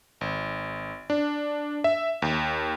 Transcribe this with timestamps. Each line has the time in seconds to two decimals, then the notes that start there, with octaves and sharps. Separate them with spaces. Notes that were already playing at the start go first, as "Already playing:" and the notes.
0.21 G#1
1.10 D4
1.84 E5
2.22 D#2